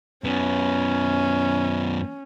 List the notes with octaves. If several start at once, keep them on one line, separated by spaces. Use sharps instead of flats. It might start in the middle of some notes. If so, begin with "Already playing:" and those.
F#2 B3 C#4